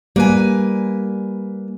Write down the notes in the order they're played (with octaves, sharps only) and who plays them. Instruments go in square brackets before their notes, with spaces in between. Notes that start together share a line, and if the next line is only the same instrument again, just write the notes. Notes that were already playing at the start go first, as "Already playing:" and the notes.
[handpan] G3 [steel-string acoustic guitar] A#3 B4 G#5